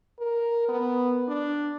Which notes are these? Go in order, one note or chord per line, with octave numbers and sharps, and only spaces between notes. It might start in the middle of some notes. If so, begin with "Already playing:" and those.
A#4
B3
D4